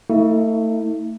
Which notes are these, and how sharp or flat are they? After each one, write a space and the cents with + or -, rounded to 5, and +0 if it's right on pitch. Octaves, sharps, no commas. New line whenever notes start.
A3 +30 E4 -45